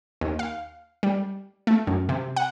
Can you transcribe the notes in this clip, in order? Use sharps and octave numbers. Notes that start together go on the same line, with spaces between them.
D#2
F5
G3
A3
F#2
C3
F#5